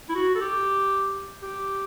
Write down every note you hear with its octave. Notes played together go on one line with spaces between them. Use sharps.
E4
F#4
A4
G4
G4